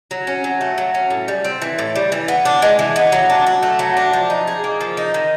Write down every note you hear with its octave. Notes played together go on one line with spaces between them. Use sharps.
F#3
C#4
F#3
A3
F#3
C#4
A2
G3
C4
E3
A2
G3
E3
B3
D4
G#3
E3
B3
F#3
D4
F#4
A3
F#3
D4
F3
D#4
G#4
A#3
F3
D#4
D#3